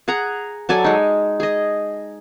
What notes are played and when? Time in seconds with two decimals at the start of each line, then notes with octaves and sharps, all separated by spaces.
0.08 G#4 F#5 A#5
0.69 F#3 A4 D5 G#5
0.84 G#3 D#4
1.40 G#4 D#5